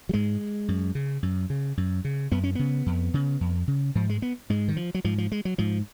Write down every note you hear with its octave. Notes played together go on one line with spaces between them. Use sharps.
F#3
G#2 G#3
F#2
C#3
F#2
C#3
F#2
C#3
F#2 B3
C#4
C#3 B3
F2
C#3
F2
C#3
G#2 F3
G#3
B3
G#2 G#3
D#3
F3
F#3
G#2 F3
F3
G#3
F#3
G#2 F3